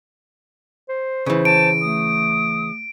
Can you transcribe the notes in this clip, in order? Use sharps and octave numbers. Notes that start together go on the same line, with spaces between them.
C5
C#3 E3 C5
A5 D7
A3 D#6